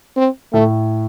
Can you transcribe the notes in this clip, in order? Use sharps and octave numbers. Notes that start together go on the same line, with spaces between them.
C4
A2 A3